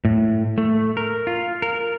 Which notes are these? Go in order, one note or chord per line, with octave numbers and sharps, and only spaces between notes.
A2
A3
A#4
F4
A#4